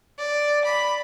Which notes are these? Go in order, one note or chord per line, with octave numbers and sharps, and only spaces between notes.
D5
B5